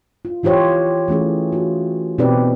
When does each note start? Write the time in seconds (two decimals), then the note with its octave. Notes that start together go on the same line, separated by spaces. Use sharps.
0.25 F4
0.43 E3 F4 G4 C5 C#5
1.08 E3 A3 C#4 G#4
1.52 F4 F#4
2.18 B2 C4 D#4 G4 B4 D5